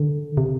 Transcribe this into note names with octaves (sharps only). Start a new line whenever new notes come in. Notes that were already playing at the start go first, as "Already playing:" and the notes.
Already playing: D3
C3